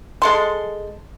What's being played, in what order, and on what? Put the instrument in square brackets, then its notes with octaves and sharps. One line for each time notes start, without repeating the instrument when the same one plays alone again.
[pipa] G#3 A4 C6